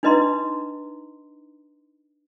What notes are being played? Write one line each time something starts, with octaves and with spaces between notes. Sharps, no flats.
D4 D#4 B4 D#5 A#5 C6